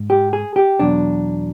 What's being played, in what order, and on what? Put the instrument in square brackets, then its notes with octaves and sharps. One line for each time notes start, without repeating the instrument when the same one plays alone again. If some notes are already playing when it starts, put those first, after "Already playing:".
Already playing: [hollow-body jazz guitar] G#2
G4
G#4
G4
E2 B2 F#3 D4